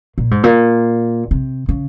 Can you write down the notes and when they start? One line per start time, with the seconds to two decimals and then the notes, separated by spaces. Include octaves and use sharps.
0.18 A#2
0.31 G#2
0.43 A#2
1.31 C3
1.69 C#3